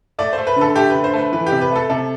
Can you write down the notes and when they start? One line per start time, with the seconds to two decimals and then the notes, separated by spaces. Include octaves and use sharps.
0.19 A3 D5
0.33 A3 C5
0.47 B4
0.56 D3
0.61 A4
0.76 A3 G4
0.90 D3 B4
1.04 C5
1.13 A3 B4
1.32 E3 B4
1.46 G4
1.52 C3
1.61 B4
1.71 A3 A4
1.89 C3 A4